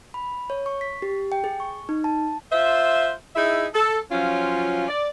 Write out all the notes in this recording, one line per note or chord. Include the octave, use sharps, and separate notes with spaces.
B5
C#5
C#6
B6
G4
G5
G#4
C#6
D#4
A5
F4 C5 E5
D#4 E4 G#4 E5
A4
F3 F#3 C#4 F4
D5